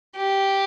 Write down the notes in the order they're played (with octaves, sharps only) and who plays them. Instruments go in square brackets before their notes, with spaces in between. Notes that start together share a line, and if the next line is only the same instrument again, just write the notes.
[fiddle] G4